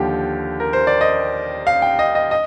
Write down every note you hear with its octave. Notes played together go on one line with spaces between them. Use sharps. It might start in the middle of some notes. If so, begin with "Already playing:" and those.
Already playing: D#2 D3 F3 G4
A#4
C5
D5
D#5
F5
G5
D#5
D#5
D#5